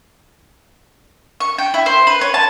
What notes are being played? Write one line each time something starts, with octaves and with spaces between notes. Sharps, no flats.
C#6
G5
E4
C5
B4
C#5
A5